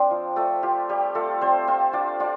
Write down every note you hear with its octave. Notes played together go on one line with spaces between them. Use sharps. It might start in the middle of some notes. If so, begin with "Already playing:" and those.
Already playing: C4 D4 F4 C5 D5 F5
F3
F3 A3 A4
F4 G4
G3 G4
A3 F4 A4
G3 C4 C5
C4 F4 C5
D4 F4 D5
D4 F4 D5